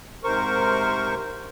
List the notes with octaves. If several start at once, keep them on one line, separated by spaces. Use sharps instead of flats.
G#2 C3 A#4 C5 C#6